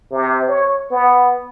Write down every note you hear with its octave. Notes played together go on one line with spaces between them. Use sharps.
C3
C#5
B3